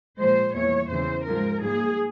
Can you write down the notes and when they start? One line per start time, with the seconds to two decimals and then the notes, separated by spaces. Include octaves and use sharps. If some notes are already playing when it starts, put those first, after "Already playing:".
0.18 A#2 F3 G#3 C5
0.54 E2 E3 G3 A#3 C#5
0.89 E2 C#3 E3 C5
1.25 G#2 F3 G#3 A#4
1.60 G#2 G3 A#3 G#4